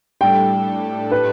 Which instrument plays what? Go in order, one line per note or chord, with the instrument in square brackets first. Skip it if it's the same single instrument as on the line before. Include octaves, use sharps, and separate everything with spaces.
[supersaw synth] A2 G3 D4 A4 [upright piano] G5
[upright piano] B4